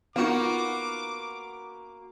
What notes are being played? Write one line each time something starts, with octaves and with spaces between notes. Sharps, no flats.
A#3 B3 D#4 F4 F#4 F5 D6